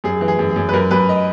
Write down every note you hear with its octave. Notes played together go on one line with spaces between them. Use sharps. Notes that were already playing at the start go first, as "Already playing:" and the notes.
F#2 G#4
E3
G#4
F#2
G#4
F#2
B4
F#2 A#4
F#2 B4
D#5